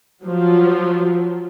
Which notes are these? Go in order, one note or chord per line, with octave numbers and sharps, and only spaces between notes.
F3 F#3